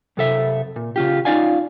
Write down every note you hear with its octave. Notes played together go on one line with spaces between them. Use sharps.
F#2 C3 A4 E5
A#2
C#3 F4 G4
C#4 D#4 F4 D5 F5 G#5